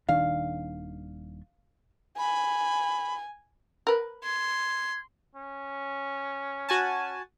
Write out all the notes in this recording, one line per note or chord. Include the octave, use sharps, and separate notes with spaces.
D#1 D#3 D4 F5
G#5 B5
A#4 B4
C6 G#6
C#4
F#4 G#5 A5